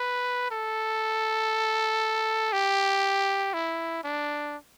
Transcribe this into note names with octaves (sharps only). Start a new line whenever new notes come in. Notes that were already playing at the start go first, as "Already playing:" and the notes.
Already playing: B4
A4
G4
E4
D4